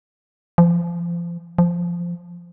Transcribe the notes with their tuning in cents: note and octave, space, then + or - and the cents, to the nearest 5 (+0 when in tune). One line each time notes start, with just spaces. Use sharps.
F3 -30
F3 -10